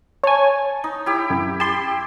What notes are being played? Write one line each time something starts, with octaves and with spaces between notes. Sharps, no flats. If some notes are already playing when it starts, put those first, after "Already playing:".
C#5 G#5 A5
D#4
E4 G4
F#2
G4 A5 C6